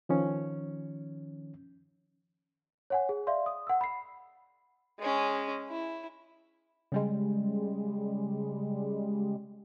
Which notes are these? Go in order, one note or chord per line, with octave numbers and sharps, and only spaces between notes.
D#3 F3 C#4
C#5 F#5 G#5
G#4
D5 E5 F5 C6
D#6
F#5 E6
B5 C7
G#3 C#4
E4
C#3 G3 G#3